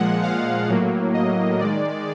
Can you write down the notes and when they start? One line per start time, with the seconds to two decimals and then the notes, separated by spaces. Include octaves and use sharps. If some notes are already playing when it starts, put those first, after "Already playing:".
Already playing: A#2 F3 G#3 F#5
0.23 F5
0.68 A2 F#3 A#3
1.14 D#5
1.60 D#3 G#3 D5